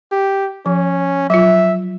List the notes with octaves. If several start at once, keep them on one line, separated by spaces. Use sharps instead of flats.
G4
F3 C#4
F#3 F4 E5